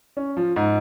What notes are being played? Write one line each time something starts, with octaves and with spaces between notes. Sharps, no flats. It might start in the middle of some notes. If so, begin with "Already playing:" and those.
C#4
F3
G#2